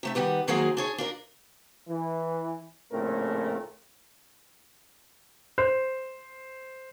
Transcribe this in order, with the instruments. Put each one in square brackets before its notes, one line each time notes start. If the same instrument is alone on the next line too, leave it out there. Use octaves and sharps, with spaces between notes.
[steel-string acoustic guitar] C3 A3 E5
D#3 G3 B3 G4
D#3 F3 F#3 G#3 A#3 G#4
D4 G#4 C#5
D4 F4 A#4
[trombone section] E3
A#1 A2 C#3 A3 C4 A#4
[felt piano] C5